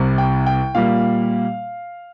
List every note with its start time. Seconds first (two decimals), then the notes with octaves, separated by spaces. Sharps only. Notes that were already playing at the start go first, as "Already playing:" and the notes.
Already playing: C2 C3 G3
0.18 G5
0.46 G5
0.75 A#2 G3 A#3 F5